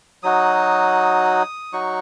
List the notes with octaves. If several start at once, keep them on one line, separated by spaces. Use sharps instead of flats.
F#3 D#4 F#4 D#6
F#3 D#4 F#4 C#6